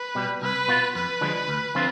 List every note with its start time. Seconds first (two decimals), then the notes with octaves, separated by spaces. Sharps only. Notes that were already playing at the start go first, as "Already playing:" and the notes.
Already playing: B4
0.15 B2 G3
0.41 C2 B4
0.68 B2 B3 F4
0.95 F2 B4
1.21 D3 F3 G#3
1.48 D2
1.75 D3 F3 C4 F4